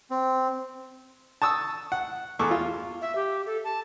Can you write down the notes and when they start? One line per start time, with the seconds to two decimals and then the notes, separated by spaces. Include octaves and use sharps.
0.11 C4
1.42 A5 C#6 D#6 E6
1.92 F#5
2.39 E2 A4 C#6 D6 E6
2.51 F4
3.01 E5
3.15 G4
3.46 A4
3.64 A5